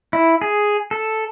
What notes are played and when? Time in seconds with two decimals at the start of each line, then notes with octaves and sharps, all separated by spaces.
0.13 E4
0.42 G#4
0.91 A4